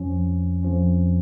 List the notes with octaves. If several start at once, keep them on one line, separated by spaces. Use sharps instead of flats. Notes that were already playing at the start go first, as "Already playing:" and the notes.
Already playing: F2 F3 C#4
F2 F3 C#4